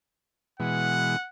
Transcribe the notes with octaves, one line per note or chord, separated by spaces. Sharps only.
B2 E3 G#3 F#5